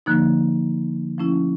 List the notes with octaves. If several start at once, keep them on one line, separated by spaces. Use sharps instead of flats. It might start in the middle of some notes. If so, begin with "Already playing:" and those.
D3 F3 A#3 D#4
F3 A3 C#4 E4